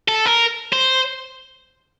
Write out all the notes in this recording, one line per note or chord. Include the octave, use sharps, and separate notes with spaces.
A4
A#4
C5